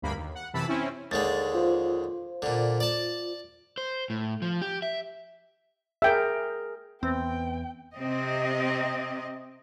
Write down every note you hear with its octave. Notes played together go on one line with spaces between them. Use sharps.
D2 G2 A#3 B5
D#2
F#5
F#2 C3 E3 A5 B5 E6
C4 C#4 E4
D#2 D3 G#3 A6
F4 C5
A#2 D3
D5 A5
C5
A2
F3
G4
E5
G#4 A#4 E5 G5
E2 B3 C4 G5
C3 C4 D#5